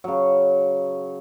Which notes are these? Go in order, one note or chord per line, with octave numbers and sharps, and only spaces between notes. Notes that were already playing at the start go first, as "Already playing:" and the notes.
C#3 F#3